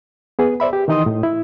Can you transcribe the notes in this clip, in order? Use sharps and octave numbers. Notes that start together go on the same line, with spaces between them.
B3 G#4 B4
C5 D5 E5 B5
G4
D#3 E3 D#4 D#5 C6 D#6
A2
E4